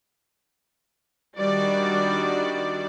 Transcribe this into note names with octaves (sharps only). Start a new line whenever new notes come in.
D#3 G3 D4 F#4 D5